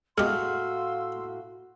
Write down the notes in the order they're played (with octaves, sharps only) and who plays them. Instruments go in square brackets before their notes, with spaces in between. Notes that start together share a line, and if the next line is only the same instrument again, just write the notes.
[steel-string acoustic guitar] A2 F#4 [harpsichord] G#3 G4 [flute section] F5 C6 E6 [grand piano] F6